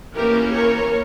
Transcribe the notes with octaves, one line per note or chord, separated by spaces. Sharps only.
E3 A#3 C#4 G4 A#4
A#4 C#5